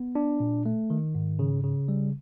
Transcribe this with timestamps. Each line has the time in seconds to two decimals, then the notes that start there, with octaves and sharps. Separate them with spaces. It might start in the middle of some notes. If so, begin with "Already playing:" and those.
Already playing: B3
0.15 D4
0.40 A#2
0.66 A3
0.90 D#3
1.15 G#2
1.39 C#3
1.63 C#3
1.88 G3